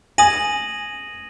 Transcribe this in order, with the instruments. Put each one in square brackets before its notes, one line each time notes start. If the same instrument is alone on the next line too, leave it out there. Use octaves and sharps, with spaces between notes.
[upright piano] G#5 [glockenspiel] D#6 A#6 D#7 F#7